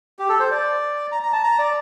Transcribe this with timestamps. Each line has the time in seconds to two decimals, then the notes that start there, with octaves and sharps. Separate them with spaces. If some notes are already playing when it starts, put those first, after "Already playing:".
0.19 G4
0.29 A4
0.40 C5
0.51 D5
1.12 A#5
1.23 A#5
1.33 A5
1.43 A#5
1.59 D5